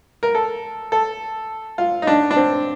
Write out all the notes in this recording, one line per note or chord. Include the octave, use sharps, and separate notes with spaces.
A#4
A4
A4
F4
D#4
D4
D4
C4